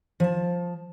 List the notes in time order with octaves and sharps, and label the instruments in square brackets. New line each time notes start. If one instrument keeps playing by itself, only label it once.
[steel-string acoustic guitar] F3 A5